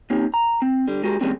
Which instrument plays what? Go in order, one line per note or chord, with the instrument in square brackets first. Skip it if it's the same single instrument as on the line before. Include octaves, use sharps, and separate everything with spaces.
[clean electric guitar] A#3 C4 C#4 D#4 G4
A#5
C4
D3 G3
G#3 F#4 G4 A#4
E3 G3 G#3 A#3 C4 C#4